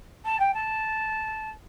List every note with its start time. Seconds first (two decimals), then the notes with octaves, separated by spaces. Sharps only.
0.25 A5
0.40 G5
0.54 A5